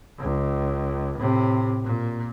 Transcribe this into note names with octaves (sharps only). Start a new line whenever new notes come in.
C#2
A2 C3
A#2